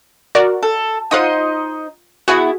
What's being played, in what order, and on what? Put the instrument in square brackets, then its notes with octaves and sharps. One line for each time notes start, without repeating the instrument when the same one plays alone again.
[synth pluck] F#4 A#4 D5
[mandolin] A4
[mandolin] D#4 C5 D#5 [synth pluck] F4 F#5 D#7
[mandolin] B3 E4 [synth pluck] F#4 G#4